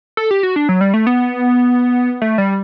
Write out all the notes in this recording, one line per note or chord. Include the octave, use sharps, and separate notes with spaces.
A4
G4
F#4
D4
F#3
G3
A3
B3
A3
G3